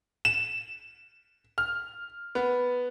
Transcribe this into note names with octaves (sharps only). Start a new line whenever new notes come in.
E7
F6
B3